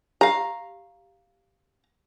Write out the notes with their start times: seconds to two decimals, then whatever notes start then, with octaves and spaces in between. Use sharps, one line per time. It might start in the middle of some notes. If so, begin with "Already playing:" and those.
0.21 G4 F5 A#5